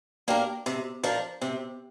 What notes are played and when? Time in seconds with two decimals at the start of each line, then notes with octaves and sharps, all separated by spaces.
0.28 A#3 D4 G4 A#4
0.66 C3
1.03 F3 D4 A#4
1.41 C3